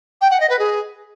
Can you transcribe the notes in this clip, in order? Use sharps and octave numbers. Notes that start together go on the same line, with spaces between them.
G5
F#5
D#5
B4
G#4